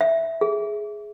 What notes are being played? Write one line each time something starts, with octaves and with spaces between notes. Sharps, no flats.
E5
G#4